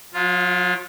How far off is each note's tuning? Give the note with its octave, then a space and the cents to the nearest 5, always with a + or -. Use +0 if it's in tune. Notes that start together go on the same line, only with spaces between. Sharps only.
F#3 -45 F4 +0